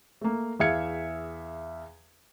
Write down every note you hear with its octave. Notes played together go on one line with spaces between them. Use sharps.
A3 A#3
E2 G#4 E5 F5 G#6 C#7